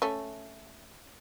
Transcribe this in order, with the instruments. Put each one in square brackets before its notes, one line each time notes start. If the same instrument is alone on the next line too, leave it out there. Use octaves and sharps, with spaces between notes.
[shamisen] A3 C#4